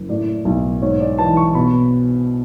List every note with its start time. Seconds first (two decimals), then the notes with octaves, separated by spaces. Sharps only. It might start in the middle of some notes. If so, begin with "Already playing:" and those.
Already playing: F#1
0.09 A2 D5
0.45 B1
0.82 G#2 C#5
1.01 D5
1.18 E3 A5
1.37 C#6
1.55 B2 B5